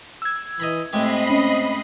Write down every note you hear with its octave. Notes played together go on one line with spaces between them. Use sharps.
E6 G#6
E3 D#5 A#5 B5
A2 G#3 C4 G4 D#5 B5 C7
C#4